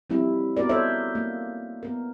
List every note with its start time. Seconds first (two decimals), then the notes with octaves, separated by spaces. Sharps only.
0.10 F3 G3 C4 D#4 E4
0.57 B3 F#4 A#4 D5
0.69 D#4 A4 C5 C#5 E5
1.15 A#3
1.83 B3 A#4